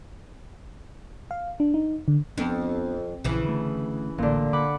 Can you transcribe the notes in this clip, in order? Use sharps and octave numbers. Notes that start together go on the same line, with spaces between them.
F5
D4
D#4
D3
F2 B3 D4
A#1 C#3 E3
D3 A3
A1 A#2 D3
D3 F#5 B5 D6